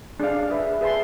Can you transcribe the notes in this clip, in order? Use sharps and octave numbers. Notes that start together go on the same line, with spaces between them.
D4 G#4 D5 F5
G#4 B4 E5
G#4 B4 E5 A5 C6